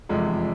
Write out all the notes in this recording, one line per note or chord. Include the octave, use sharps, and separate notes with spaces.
F1 E2 C3 F3 G#3